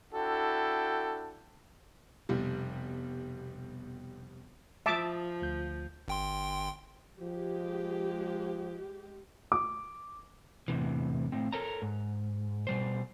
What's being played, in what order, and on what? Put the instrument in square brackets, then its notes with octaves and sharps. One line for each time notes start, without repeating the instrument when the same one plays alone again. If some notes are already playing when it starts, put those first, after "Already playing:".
[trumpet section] D4 E4 F#4 A4 G5
[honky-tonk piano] F1 B2 G3
[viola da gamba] F3 [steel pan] E5 A5 D6 [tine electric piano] D#6
[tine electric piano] D2 G6
[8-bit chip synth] G1 G5 C6
[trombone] F3 [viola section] G#3 G4
[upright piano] D6
[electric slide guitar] E2 A2 C3 E3
A2 C4
A4 A#4 C#5 A#5
G#2
B2 G3 C5